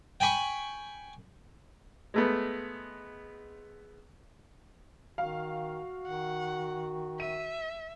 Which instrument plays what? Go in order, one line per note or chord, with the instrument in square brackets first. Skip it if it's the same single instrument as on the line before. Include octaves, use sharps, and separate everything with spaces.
[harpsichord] G5 G#5 B5 C#6
[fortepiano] G#3 A3 B3
[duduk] D#3 [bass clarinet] F#4 [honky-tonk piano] F5
[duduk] D#3 [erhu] F#5
[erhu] E5 [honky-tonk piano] D#7